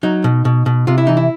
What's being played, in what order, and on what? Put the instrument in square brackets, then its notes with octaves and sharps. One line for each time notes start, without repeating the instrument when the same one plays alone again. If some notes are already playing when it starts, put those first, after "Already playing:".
[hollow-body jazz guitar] F#3 D#4
B2
B2
B2
C3 F4
E4
E3 D#4
E4